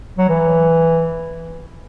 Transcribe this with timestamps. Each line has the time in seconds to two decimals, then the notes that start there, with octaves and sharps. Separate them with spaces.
0.18 F#3
0.29 E3